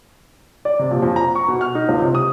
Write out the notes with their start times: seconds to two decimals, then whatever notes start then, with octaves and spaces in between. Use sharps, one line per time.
0.65 D5
0.79 C3
0.91 A#1
1.02 F2
1.16 A#5
1.35 C#6
1.48 B2
1.61 F6
1.75 D#4
1.89 C#2
2.02 C3
2.15 D#6